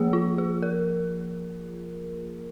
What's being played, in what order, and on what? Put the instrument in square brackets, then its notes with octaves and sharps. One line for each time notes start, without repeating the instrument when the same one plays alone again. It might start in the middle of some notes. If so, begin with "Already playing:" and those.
Already playing: [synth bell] F3 A#3 G#4
F4
G#4
A#4